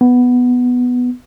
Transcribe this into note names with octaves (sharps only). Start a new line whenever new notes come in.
B3